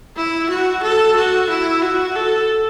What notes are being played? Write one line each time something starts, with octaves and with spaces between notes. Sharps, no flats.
E4
F#4
A4
F#4
E4
F#4
A4